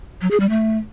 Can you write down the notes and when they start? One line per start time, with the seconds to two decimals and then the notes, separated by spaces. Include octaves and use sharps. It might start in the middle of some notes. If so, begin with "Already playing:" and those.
0.21 F#3
0.31 G#4
0.40 G3
0.49 A3